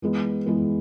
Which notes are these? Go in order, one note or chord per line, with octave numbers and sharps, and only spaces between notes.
E3 G#3 B3
E3 G#3 B3